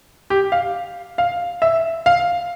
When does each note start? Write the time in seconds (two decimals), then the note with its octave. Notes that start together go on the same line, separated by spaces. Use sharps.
0.30 G4
0.52 F5
1.18 F5
1.62 E5
2.06 F5